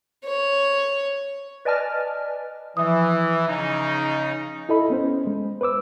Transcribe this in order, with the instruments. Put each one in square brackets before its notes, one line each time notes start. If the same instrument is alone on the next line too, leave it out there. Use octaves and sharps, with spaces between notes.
[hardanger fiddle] C#5
[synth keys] B4 D5 D#5 G#5 A5 F6
[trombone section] E3 [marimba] F3 E5 D#6
[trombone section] C#3 D#4
[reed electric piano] E4 A4 D#5 B5
B3 C#4 C5
G#3
B4 C5 D6 E6